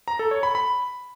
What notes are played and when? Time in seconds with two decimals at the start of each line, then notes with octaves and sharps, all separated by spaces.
0.08 A#5
0.19 A4
0.31 C#5
0.43 B5
0.55 B5